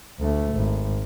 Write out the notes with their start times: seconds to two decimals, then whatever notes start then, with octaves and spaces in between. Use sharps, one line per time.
0.19 D2 A3
0.54 G#1